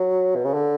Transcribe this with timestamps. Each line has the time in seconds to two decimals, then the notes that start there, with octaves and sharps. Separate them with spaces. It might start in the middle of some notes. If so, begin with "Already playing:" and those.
Already playing: F#3
0.36 B2
0.45 C#3
0.54 D3